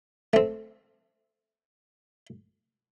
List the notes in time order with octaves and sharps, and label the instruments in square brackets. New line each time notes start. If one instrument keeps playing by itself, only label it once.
[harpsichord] A3 C4